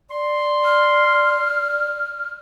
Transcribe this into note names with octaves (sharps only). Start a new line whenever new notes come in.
D5 C6
F6